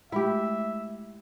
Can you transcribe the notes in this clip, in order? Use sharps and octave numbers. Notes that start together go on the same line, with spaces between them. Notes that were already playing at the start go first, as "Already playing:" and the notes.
G#3 A3 E4 G4 E5